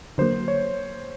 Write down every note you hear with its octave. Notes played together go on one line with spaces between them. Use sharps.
D3 F#3 A#3 C5
C#5